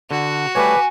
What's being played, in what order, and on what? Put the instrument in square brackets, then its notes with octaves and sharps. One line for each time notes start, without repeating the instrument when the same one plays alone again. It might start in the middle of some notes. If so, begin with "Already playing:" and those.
[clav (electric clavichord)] D3 [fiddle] F#4
[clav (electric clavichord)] G3 A3 C#5 [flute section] B4 D6 [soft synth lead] G#5